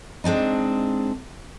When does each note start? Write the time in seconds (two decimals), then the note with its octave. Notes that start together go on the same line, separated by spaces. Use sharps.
0.24 G#3 C4 D4 D#4